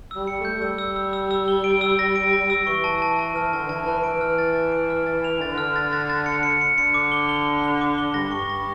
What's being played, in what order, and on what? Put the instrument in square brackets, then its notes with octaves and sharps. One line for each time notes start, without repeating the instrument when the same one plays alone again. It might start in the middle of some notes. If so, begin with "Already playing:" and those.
[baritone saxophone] G3 [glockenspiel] E6
[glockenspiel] C#7
[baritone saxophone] A3
[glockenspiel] G6
[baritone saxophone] G3 [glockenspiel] E6
[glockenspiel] E6
E6
E6
E6
G7
D7
E6
A#6
D7
A#6
E6
[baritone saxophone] E3 [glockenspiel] C#6
[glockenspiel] A5
A5
A5
[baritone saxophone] E3 [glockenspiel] F6
[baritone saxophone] D3 [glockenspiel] A5
[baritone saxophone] E3 [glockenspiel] A5
[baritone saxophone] E3 [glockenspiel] A5
[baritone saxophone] E3 [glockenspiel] D7
[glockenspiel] F6
A6
A6
D7
F6
A6
F7
[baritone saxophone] D3 [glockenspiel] A6
[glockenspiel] F6
A6
A6
A6
C#7
C#7
C#7
[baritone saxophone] D3 [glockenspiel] C#7
[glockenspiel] D6
G7
G7
G7
G7
D6
G7
[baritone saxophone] G2 [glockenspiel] A#6
[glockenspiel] C#6
A#6